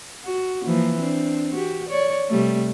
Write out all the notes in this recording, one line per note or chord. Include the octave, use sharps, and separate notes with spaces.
F#4
E3 F3 A#3
C4 D4
F#4 G4
C#5 D5
C3 G3 A3